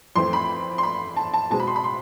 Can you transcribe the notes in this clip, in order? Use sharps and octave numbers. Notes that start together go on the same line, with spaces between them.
F2 E3 A3 C4 C6
B5
C6
B5
A5
A5
B2 G#3 C4 A5
B5
C6
B5
C6